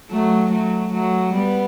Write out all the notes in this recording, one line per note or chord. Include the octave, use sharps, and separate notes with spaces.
F#3 A3
F#3 A3
F#3 A3
G3 B3